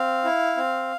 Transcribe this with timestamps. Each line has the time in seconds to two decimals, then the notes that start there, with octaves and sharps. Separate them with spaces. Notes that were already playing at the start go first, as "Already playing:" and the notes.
Already playing: C4 F5
0.24 E4
0.57 C4